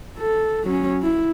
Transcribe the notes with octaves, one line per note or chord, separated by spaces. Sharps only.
A4
F#3 C#4
E4